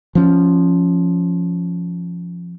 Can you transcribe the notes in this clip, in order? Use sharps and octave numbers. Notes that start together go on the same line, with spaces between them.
F3 C#4